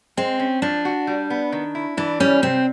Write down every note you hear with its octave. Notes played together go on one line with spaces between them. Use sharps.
G#3 C4
C#4
F3 D4
F#4
G3
B3
D#3
E4
E3 D4
G3 C#4
C3 C4